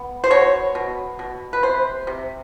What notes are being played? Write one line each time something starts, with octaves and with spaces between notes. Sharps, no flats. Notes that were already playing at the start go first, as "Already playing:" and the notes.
Already playing: B3
C5
B2 C#5
B2
B2
B4
C3 C5
C3